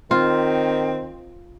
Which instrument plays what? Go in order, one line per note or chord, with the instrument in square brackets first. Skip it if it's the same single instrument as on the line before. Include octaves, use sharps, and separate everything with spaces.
[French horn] D#3 [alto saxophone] C4 [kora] F4